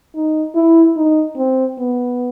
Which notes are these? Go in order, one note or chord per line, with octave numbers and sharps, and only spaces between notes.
D#4
E4
D#4
C4
B3